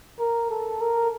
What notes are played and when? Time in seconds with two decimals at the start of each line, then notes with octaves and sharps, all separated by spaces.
0.20 A#4
0.51 A4
0.81 A#4